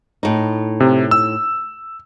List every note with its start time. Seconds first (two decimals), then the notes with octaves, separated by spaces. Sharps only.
0.23 A2 D#4
0.80 C3
1.11 E6